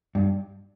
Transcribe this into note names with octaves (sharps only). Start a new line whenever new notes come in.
G2